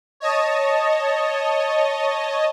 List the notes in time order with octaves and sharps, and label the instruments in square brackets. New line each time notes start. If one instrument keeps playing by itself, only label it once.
[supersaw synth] C#5 D#5 A5